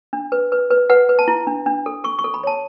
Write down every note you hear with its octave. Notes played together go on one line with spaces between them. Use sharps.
D4
B4
B4
B4
B4 F#5
B4
A5
E4
D4
D4
A4
A4 C#6
C#6
A4
B5
C#5 A5